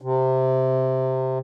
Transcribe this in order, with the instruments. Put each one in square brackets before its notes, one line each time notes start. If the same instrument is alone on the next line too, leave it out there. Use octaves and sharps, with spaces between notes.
[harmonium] C3